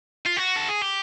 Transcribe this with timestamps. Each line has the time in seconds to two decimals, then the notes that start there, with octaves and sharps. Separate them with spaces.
0.26 F4
0.37 F#4
0.56 A4
0.69 G#4
0.82 G4